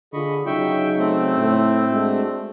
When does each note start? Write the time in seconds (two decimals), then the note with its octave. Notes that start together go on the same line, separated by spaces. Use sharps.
0.13 D3 F4 G#4 D#5 B5 C#6
0.46 C#3 F#3 D#4 E5 G5 C#6
0.99 A3 C4
1.38 A2
1.91 G#3 D4 F#4